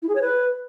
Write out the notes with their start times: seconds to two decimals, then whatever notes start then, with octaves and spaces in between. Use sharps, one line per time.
0.02 E4
0.09 G#4
0.15 C#5
0.22 B4